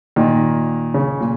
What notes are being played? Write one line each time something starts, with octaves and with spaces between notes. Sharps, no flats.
A#2 D#3
C#3
A#2